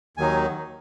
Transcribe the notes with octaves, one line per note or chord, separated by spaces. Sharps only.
D#2 D#3 F#3 D#4 G#5